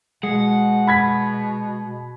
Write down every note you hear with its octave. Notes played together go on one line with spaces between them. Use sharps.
B2 G#3 F#5
B5 G#6 B6